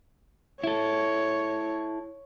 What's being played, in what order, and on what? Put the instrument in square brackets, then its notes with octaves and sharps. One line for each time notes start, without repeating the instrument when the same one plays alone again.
[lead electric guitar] E4 A4 [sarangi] C#5